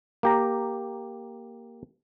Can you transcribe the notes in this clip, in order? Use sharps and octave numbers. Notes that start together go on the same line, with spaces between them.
A#3 G4 A#5